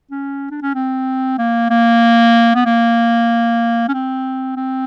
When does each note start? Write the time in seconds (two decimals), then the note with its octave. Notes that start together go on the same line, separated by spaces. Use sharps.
0.11 C#4
0.50 D4
0.62 C#4
0.74 C4
1.38 A#3
1.70 A#3
2.55 B3
2.65 A#3
3.88 C#4
3.93 C4
4.56 C4